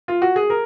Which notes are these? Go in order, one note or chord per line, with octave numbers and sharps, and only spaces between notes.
F4
F#4
G#4
A#4